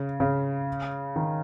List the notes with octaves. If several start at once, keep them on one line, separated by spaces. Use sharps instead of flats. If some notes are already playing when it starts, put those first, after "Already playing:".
Already playing: C#3
C#3
D#3